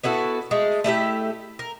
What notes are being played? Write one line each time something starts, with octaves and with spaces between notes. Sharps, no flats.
B3 E4 F#4 A4
G#3 A3
A3 E4 G4 E5
A#4